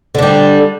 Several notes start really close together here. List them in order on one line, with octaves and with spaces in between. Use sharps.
D3 D4 G3